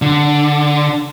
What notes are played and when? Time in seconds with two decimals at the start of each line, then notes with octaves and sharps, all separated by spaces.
0.02 D3